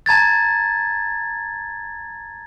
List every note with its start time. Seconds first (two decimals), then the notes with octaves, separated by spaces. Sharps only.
0.06 A5 A#5 G#6 A6